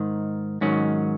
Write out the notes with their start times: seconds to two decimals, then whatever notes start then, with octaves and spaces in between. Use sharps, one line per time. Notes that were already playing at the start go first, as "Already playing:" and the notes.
Already playing: G#2 D#3
0.61 G#2 D#3 F#3 C#4